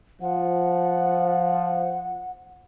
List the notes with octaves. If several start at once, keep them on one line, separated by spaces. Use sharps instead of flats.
F3 F#5